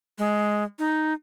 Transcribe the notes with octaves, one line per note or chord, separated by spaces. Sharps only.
G#3
D#4